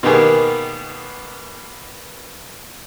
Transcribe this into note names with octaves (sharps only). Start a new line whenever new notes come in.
B2 D#3 A#3 B3 G4 G#4